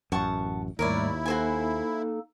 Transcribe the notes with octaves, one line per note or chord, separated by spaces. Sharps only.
A1 F#2 F#5 A5 C#6
D#2 G#2 G3 A3 E4 A#4 C#5 D5
A#3 D#4 F#4 A4 C5 G#5